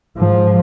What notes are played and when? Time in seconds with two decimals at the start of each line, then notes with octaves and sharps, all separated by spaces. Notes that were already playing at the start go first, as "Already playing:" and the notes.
0.17 G#2 F3